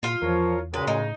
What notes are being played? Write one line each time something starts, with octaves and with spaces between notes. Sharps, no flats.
A#2 F4 F5
E2 F3 A#4 C#5
F#2 A#2 C#3 G#3 B4
A2 D#4